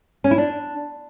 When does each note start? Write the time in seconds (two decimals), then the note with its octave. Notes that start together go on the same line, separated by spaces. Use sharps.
0.24 C#4
0.31 E4
0.38 D4